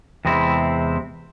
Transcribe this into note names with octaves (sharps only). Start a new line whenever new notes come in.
E2 C3 G#3 C4 E4